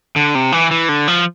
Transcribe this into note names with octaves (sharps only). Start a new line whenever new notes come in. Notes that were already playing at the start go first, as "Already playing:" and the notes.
D3
C3
E3
E3
D3
F3